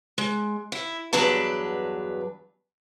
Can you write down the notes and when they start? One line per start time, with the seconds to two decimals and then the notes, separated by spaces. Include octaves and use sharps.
0.18 G#3
0.72 E4
1.13 E2 G2 F#3 D4 B4 A5